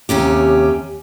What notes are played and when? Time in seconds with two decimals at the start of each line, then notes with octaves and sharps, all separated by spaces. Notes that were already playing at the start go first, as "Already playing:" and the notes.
0.09 D#2 C3 C#4 G4